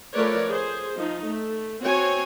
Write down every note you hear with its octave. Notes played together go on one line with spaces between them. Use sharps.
F3 A3 A#4 B4 C#5 D5
G#4 C5
F3 D#4
A3
C4 F#4 C#5 G#5